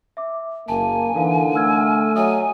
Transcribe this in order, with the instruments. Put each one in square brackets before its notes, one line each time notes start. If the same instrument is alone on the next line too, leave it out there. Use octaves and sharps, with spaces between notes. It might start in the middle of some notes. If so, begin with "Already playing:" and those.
[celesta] E5 D6
[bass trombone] F#1 [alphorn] A#3 [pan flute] G#5 [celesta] A5
[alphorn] D3 [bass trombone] E3 [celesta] D#4 A#4 F5
[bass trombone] A3 [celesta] E6 F6 G#6
[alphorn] F#3 [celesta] D#5 E5 D#6 [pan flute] G#5